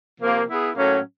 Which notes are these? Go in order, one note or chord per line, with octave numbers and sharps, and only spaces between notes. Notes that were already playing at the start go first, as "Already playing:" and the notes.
C3 F3 A#3
B3 E4 G#4
A2 F#3 A#3 C#4